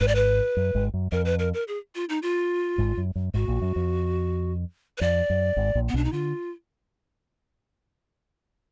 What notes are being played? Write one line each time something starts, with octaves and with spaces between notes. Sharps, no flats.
G#1 G#2 B4
D5
B4
F#2
G#1 G#2
F#2
F2 A#4
B4
A#4
A#4
G#4
F4
D#4
F4
G#1 G#2
F#2
F#2
G#1 G#2 F#4
A#1 A#2
F#2
F2
B4
F2 D5
F#2
G#1 G#2
A#1 A#2
B3
B1 B2 D4
D#4
D3 F4